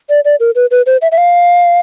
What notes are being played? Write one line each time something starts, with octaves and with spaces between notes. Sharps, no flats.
D5
D5
A#4
B4
B4
C5
E5
E5
F5